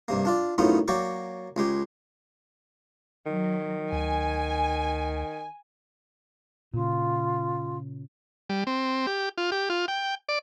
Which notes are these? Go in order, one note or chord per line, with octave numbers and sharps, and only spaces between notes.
G2 C3 A#3
D4 F4 D5
F#2 A2 B3 D#4 F4
F#3 A#3 D5 G5 C#6 D6
C#2 G#3 G4
D#3 F#3
D2 G#5
A#2 C#3 F4
G3
C4
G4
F4
G4
F4
G5
D5